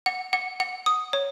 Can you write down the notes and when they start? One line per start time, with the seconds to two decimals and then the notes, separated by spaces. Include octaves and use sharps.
0.06 F#5
0.33 F#5
0.60 F#5
0.86 D#6
1.13 C#5